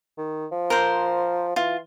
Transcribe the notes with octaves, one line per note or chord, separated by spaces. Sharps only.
D#3
F3
A#4 C5
E3 F4